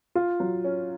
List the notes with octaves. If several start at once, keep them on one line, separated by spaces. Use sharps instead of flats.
F4
F#3
C#4